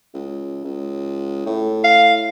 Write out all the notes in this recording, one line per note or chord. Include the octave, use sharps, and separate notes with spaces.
C#2
C#2
A2
F5